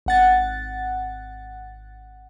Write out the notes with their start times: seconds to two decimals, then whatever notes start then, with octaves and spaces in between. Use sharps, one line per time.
0.06 G#1 F#5 A6